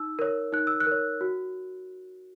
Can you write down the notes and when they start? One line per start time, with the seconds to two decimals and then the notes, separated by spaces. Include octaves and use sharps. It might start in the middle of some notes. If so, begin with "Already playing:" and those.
Already playing: D#4 E6
0.19 A#4 C#5
0.53 D#4 F#6
0.67 E6
0.80 F#6
0.87 A#4 C#5
1.21 F#4